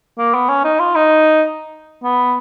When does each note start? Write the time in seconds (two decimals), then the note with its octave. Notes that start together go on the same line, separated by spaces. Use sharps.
0.18 A#3
0.34 B3
0.49 C#4
0.64 D#4
0.79 F4
0.95 D#4
2.04 B3